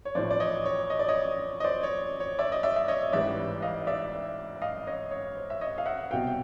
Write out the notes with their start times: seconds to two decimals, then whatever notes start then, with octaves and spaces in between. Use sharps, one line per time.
0.05 C#5
0.15 A1 A2 F3 C5 D5
0.31 D5
0.40 C#5 D#5
0.65 C#5
0.90 D#5
0.99 D5
1.08 C#5 D#5
1.60 D#5
1.64 C5 D5
1.83 C#5
2.20 C#5
2.39 D5 E5
2.52 D#5
2.63 D5 E5
2.76 E5
2.88 C#5 D#5
3.13 A1 G#2 E3 G3 D5 E5
3.62 D#5 F5
3.87 D5 E5
4.62 D#5 F5
4.87 C#5 D#5
5.11 C#5
5.37 C5
5.50 E5
5.61 C#5 D#5
5.78 F5
5.86 E5 F#5
6.11 C2 B2 F#3 F5 G5
6.27 G5